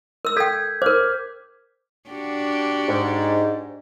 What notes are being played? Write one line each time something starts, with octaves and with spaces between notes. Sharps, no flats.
A#4 E6
A4 G5 G6 G#6 B6
A#4 C5 D6 F6
D4 F#4 G4
G#2